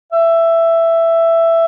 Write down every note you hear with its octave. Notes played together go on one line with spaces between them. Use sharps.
E5